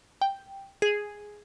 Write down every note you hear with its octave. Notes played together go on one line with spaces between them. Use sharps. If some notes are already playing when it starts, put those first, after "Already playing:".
G5
G#4